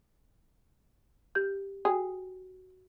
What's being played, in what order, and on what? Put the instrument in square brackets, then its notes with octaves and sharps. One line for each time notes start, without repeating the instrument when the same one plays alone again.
[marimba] G4 G6
[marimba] F#4 G5 D#6 [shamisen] G#4